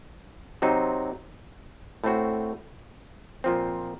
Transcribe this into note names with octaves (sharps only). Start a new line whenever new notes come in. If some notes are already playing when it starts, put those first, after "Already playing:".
C3 F#3 C4 D#4
A2 A3 C4 F#4
A#2 F3 C4